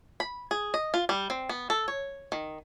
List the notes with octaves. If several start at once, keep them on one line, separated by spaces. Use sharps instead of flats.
B5
G#4
D#5
F4
G3
C4
B3
A4
C#5
D#3